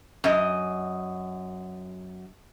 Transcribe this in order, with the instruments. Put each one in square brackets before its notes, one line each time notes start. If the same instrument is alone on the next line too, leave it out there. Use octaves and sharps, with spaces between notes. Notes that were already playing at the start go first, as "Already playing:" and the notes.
[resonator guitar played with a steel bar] F#2 D#5